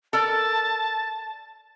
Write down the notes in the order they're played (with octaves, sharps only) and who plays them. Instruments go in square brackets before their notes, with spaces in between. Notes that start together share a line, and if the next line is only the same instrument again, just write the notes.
[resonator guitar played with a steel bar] A4 A#4 D5 [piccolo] A5